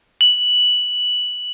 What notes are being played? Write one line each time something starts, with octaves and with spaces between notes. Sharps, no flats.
F#7